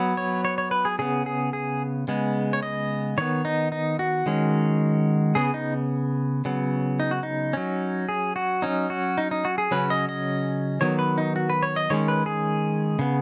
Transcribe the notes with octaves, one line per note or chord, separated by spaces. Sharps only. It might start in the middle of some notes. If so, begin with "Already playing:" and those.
Already playing: F#3 B3
C#5
C#5
C#5
B4
G#4
C#3 B3 G#4
G#4
G#4
C#3 G#3 B3
C#5
D#5
D#3 B3 C#5
D#4
D#4
F#4
D#3 G#3 C#4
C#3 B3 G#4
D#4
C#3 F#3 B3
D#4
F#4
D#4
F#3 C#4
G#4
F#4
F#3 C#4 D#4
F#4
D#4
D#4
F#4
G#4
C#3 F#3 C#4 B4
D#5
D#5
D#3 F#3 B3 C#5
B4
D#4
F#4
B4
C#5
D#5
D#3 G#3 C#4 C#5
B4
G#4
C#3 B3